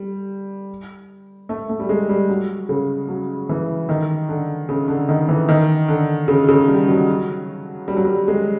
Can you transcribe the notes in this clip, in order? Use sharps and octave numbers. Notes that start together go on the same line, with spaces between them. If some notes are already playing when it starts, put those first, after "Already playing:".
Already playing: G3
A3
A3
G3
G#3
G3
F#3
C#3
F#3
E3
D#3
D3
C#3
D3
D#3
E3
D#3
D3
C#3
C#3
G3
F#3
G3
F#3
G3
G#3